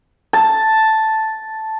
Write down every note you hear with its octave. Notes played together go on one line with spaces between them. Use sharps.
A5